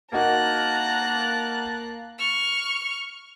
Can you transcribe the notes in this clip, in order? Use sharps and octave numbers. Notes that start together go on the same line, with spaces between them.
A#3 D#4 F#4 A#4 A5 A#5 F#6
C#6 F6